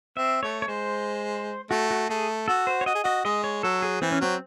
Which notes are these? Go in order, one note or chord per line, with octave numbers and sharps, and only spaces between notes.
C4 E5
A3 C#5
C#5
G#3 C5
A3 F#4
F#4
A3 G#4
F#4 A4
C5
C#5
F#4 D#5
G#4
F#4 D#5
G#3 D#5
C#5
F#3 A4
G#4
E3 C4
C#4
F#3 C4